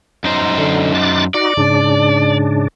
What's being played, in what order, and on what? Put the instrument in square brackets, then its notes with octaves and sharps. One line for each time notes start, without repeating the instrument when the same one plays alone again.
[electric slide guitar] F#2 D#4 C5
[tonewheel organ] D3
D6 F#6 A6
[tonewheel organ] D#4 F#4 [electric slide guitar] D5
[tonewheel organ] G#2 C#3 D4